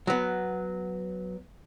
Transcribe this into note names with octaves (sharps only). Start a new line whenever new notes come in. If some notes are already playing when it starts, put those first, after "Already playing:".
F#3 B3